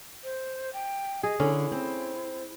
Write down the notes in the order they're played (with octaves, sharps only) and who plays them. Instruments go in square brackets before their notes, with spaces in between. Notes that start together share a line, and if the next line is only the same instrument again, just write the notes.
[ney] C5
G5
[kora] G#4 [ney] D#5
[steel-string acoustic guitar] D3 [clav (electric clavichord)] C#4 [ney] E4
[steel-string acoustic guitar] C4